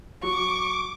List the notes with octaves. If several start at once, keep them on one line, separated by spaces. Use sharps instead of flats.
F#3 C#6 D6